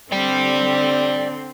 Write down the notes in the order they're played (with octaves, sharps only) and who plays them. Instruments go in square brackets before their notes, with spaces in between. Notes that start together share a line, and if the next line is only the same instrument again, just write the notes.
[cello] D3 C4 [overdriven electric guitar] D5 G5